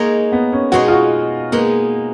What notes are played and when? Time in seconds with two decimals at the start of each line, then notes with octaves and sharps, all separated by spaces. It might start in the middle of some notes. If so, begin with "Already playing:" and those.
Already playing: G#3 A#3 D#4 A#4 C#5
0.32 B3
0.52 C#4
0.72 B2 G#3 D#4 F#4 G#4 C#5
0.88 F4
0.91 F#4
1.52 G#3 A#3 B3 D#4